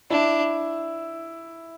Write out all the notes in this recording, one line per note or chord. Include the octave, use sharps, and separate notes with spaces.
D4 E4